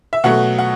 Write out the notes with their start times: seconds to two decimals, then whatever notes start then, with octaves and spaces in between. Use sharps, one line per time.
0.13 E5
0.24 B2 F#3 A3 F#5
0.58 F#5